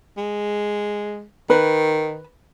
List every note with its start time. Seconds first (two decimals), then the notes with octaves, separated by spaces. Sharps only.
0.17 G#3
1.50 D#3 B4